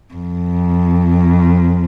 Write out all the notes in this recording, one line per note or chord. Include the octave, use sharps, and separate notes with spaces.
F2